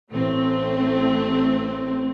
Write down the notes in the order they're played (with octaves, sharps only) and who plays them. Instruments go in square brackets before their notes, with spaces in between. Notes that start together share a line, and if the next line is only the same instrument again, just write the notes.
[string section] A1 A3 C4